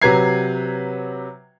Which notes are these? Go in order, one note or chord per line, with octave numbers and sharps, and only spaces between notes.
C3 F#3 B4 A#5 G#6 C7